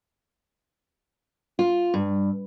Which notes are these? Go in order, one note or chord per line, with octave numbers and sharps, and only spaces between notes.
F4
G2